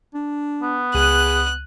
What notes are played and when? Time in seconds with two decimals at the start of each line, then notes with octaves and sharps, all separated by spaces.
0.14 D4
0.62 B3
0.94 C#2 G#4 F#6 D#7